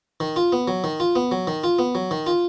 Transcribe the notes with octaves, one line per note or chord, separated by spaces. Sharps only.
D#3
F4
B3
F#3
D#3
F4
B3
F#3
D#3
F4
B3
F#3
D#3
F4